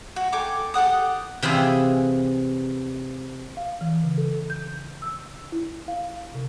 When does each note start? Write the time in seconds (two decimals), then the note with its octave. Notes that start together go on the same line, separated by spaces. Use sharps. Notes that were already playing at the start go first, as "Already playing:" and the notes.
0.16 F#4
0.32 A4 G5 G#5 D6
0.74 G4 A4 F#5 D#6
1.42 C3 E3 E4 F4 G#4
3.57 F5
3.81 E3
4.04 C#3
4.17 A4
4.50 G6
5.02 E6
5.52 E4
5.88 F5
6.35 C3